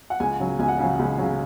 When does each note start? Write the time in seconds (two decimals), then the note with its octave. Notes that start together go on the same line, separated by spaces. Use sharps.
0.10 F#5
0.20 C#2 G#5
0.40 C#3 F#3
0.59 C#2 G#5
0.68 F#5
0.78 C#3 F#3 G#5
0.99 C#2
1.18 C#3 F#3